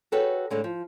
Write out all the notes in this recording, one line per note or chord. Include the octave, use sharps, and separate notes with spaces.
F#4 G#4 A4 B4 C#5 G5
A2 D3 G#3
F3